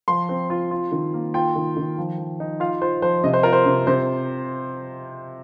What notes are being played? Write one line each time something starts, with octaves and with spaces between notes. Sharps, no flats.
F3 C6
C4
F4
F4
D#3
A#3
F4 G5
D#3
D#3
F3
F3
D#4
F4 F5
F4 C5
F3 C5
C3 D#5
C5
F4 A#4
C5
C3
C3 C5